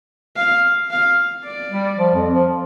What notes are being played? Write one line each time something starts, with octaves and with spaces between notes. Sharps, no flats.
F5
F5
D5
G3
F3
F2
F3